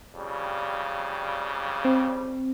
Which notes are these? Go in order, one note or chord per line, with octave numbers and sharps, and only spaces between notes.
F2 C#3 G3
C4